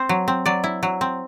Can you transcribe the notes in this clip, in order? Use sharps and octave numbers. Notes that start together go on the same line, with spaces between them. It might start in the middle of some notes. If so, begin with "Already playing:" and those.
Already playing: C4 C5
F#3
C4
F#3 D5
E4
F#3
C4